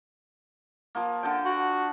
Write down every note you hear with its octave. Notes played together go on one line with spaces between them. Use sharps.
F3 A#3
D3 A4 G5
F#4